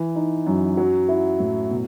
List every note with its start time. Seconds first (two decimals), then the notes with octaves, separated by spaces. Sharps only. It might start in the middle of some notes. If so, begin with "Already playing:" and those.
Already playing: E3
0.15 D#4
0.46 F#2
0.77 F#3
1.08 E4
1.40 A2
1.70 B2